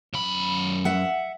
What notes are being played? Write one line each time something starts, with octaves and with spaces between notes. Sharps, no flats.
F#2 B5
E5 F#5